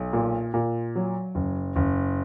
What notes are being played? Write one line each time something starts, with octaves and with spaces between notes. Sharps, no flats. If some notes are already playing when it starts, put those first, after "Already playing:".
Already playing: B1
A#2
A#2
F#3
F#1
F#1